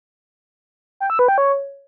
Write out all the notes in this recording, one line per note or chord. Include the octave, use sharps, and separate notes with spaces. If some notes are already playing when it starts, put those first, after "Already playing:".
G5
E6
B4
G5
C#5